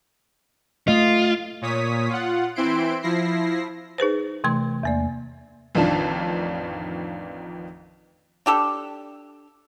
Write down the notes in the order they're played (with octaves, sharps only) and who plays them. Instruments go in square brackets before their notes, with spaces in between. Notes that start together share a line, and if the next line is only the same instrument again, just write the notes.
[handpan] A3 D#5 [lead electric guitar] F4
[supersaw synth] A#2 C#5 D#6 B6
F4 F#5
E3 C4 E4 C6 D7
F3 E4 A#6 C7
[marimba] D#4 G#4 B4 C5
C3 E3 A3 C6
E2 A#3 D5
[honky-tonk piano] A1 F2 D#3 D4 F4 A5
[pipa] D4 G4 A4